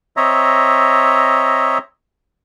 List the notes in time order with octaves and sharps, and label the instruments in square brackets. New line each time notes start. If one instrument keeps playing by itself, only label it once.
[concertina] C4 C#5 D#5 E5 A#5